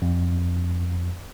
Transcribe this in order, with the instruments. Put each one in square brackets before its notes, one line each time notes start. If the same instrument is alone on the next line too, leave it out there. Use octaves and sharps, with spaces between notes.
[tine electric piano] F2